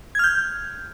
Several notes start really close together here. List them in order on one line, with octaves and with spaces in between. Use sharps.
G#6 F6 G6